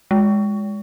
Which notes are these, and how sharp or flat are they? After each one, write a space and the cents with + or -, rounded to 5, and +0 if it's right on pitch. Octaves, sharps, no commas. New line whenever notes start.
G#3 -10